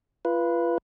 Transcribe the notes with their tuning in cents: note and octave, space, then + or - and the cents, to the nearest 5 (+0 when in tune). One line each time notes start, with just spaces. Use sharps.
F4 -30 B4 -10